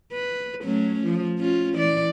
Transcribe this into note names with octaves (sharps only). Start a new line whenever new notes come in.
B4
F#3 A3 C#4
F3
C#4 F4
E3 D5